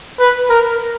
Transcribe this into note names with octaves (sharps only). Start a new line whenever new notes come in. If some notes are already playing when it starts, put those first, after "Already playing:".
B4
A#4